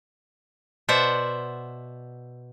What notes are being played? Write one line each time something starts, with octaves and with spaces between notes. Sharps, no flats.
B2 C5 D5 E5 F#5